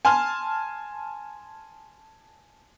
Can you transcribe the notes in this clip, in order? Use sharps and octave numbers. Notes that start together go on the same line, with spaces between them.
G#5 A5 C6 F6